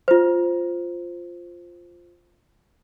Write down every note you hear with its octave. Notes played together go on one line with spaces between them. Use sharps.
F4 C5